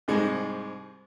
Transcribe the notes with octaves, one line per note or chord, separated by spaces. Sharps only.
C2 G#2 G3 G#3